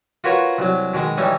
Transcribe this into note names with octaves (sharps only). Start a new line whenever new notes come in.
F4 F#4 A#4 B4 C#5
C2 F#3
B2 D#3 G#3
E3 G3 C#4 D#4